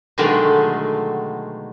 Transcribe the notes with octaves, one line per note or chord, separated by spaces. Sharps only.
B2 D3 D#3 F#3 G#3 A3